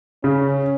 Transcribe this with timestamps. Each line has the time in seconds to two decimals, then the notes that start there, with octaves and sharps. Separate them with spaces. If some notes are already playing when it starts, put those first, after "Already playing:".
0.24 C#3 C#4